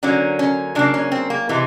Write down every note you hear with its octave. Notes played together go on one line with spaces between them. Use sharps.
D3 F#3 A#3 C#4
C#4
C#3 F#3 A#3 D4
C#4
C4
A#3
C3 E3 G#3